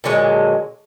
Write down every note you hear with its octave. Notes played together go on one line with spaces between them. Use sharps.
A#2 D3 F#3 G#3